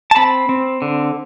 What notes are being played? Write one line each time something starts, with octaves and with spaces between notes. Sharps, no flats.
A5
C4 B5
C4
D3